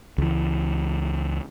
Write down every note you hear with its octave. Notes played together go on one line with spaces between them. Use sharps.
C#2 E3